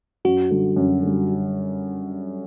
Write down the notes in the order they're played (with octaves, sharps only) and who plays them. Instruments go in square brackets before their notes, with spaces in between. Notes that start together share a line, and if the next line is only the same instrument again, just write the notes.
[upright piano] F#2 [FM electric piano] F#4
[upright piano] D3 G3
F#2
D3 G3